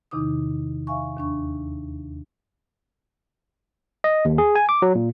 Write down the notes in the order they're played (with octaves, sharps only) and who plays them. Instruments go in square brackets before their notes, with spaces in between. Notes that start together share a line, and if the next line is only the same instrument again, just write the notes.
[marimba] E2 C3 D#3 D#4 D6 D#6
E5 F5 G#5 C#6
D#2 D4 C#6
[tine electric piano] D#5
D#2
G#4
G#5
D6
F#3
A#2